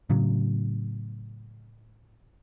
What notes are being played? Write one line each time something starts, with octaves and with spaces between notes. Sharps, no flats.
A2 C#3 F#3